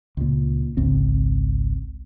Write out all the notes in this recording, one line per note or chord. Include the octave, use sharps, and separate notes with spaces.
C#2 A#2
G#1 C#2 C4